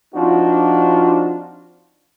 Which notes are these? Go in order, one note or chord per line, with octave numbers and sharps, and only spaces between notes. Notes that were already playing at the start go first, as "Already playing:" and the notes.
F3 C4 D4 D#4 F4 F#4